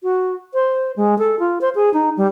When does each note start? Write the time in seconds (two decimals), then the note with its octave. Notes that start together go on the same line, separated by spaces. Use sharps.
0.03 F#4
0.54 C5
0.96 G#3
1.18 A4
1.39 F4
1.61 C5
1.75 G#4
1.94 D#4
2.17 G3